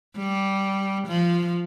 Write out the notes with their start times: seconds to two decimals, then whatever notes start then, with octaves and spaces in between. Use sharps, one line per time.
0.17 G3
1.08 F3